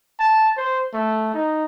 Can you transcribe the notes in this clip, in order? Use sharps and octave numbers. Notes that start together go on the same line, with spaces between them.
A5
C5
A3
D#4